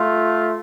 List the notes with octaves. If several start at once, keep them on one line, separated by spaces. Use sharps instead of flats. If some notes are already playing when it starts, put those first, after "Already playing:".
Already playing: A3 F4